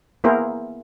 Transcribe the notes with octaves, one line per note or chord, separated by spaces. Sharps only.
A#3 B3 E4 G#4 A#4 C5